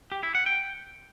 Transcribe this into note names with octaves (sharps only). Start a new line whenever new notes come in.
G4
E4
F#5
G5